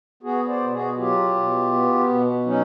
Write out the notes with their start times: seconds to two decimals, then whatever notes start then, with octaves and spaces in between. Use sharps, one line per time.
0.23 B3 F#4 G#4
0.48 C5 D5
0.60 B2
0.72 F#4 G#4
0.97 F#3 F4 G4
1.34 B2
1.72 B3
2.09 B2
2.46 F#3 C#4 D#4